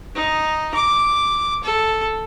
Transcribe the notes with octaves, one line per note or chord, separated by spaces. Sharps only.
D#4
D6
A4